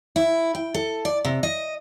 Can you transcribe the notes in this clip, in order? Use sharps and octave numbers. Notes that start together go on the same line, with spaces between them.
E4
G5
A4
D5
C3
D#5